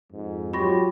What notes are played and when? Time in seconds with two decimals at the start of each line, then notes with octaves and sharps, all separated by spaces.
0.12 F2 G#2
0.53 F#3 F4 G4 B5 C#6 A#6